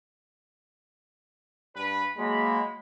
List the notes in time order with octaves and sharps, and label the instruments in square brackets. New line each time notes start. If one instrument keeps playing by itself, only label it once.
[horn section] G2 B4
[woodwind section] F#3 A#3 B5 [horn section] G#3